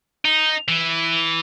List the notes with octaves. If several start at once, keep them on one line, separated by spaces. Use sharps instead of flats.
D#4
E3